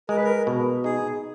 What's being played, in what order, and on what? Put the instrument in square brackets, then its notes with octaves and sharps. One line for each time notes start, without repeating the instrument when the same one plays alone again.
[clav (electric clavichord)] G#3 [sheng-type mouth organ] A#4
[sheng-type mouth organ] B4
A#4
[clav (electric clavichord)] B2
[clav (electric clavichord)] D#4 [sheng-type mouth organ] G#4